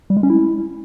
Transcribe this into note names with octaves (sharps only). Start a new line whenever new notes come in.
G3
G#3
C#4
E4